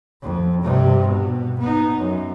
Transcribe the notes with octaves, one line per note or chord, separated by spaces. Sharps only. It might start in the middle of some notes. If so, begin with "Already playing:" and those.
F2
G2 C3
B2
B3 D#4
F#2